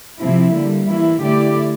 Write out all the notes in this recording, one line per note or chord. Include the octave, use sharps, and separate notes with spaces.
C3 F3 C4 E4
D3 G3 A#3
E3 A#3 E4
D3 A3 E4 G4 D5